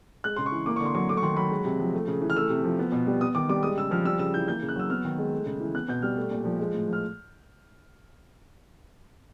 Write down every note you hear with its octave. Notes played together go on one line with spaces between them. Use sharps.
G#3 F#6
C#3 C6
C#6
E3
A#3 D6
D3 C#6
C6
F#3 C#6
A3 D6
C#6
D#3 C6
F#3 B5
G#3
C3
F3
A3
C#3
E3
F6
A3 E6
C3
F3
B3
B2
G3
B3 D#6
D#3 D6
G3 D6
G#3 D#6
C#3 E6
F3 F6
G3 E6
C#3 E6
E3 G6
A#3 G6
C#3
F#6
F#3 E6
B3 F6
D#3
G#3
A3
C#3
E3
B3 F#6
B2 G6
G3 F6
A3
A#2
F3
G#3
A2
F3
F6